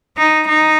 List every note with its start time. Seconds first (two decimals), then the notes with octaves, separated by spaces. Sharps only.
0.18 D#4
0.48 D#4